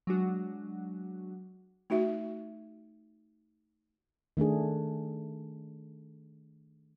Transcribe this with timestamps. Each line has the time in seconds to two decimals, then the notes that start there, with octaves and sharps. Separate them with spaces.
0.07 F#3 G#3 D4 F#4
1.90 A3 D#4 F#4 E5
4.37 D#3 A3 D4 G#4